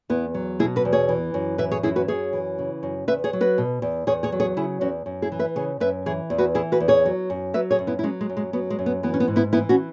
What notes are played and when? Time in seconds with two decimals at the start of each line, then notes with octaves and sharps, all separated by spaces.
0.09 E2 B3 E4
0.34 F#3
0.59 B2 E4 G#4
0.76 F#4 B4
0.85 E2
0.93 G#4 C#5
1.09 E3
1.34 F#2
1.58 E3 B4 E5
1.71 G#4 C#5
1.83 F#2 E4 G#4
1.96 F#4 B4
2.08 F#2 G#4 C#5
2.33 E3
2.58 C#3
2.83 F#2
3.08 E2 B4 E5
3.24 G#4 C#5
3.33 F#3
3.41 F#4 B4
3.58 B2
3.82 E2
4.07 E2 G#4 C#5
4.23 G#4 C#5
4.32 F#3
4.40 G#4 C#5
4.57 C#3 E4 G#4
4.81 E2 C#4 F#4
5.06 F#2
5.22 E4 G#4
5.32 E3
5.39 B4 E5
5.56 C#3 G#4 C#5
5.80 F#2 B4 E5
6.06 E3 G#4 C#5
6.30 E2
6.38 F#4 B4
6.55 E3 E4 G#4
6.72 F#4 B4
6.80 E2
6.88 G#4 C#5
7.05 F#3
7.30 F#2
7.54 F#3 B4 E5
7.71 G#4 C#5
7.79 F#2
7.87 B3 E4
7.99 E4
8.03 F#3 G#3 C#4
8.21 G#3
8.29 F#2
8.37 G#3
8.53 F#3 B3
8.70 G#3
8.79 F#2
8.86 B3
9.03 E3 B3
9.14 C#4
9.20 B3
9.28 G#2
9.36 B3 E4
9.52 E3 B3 E4
9.69 C#4 F#4